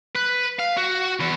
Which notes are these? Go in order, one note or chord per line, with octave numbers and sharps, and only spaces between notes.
B4
F5
F#4
E2